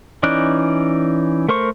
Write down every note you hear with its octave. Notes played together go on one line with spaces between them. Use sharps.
E3 C#4 D#4 D5 F#6
A3 A#4 C5 C#6